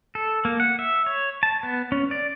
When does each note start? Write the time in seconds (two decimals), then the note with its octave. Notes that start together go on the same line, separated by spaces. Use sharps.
0.15 A4
0.45 A#3
0.60 F#5
0.79 E5
1.06 C#5
1.43 A5
1.63 B3
1.92 C#4
2.11 D5